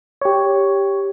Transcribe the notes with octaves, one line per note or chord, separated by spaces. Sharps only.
G4 C#5